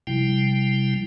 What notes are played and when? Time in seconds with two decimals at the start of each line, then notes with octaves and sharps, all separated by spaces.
0.07 C3 F3 G3 E4 G5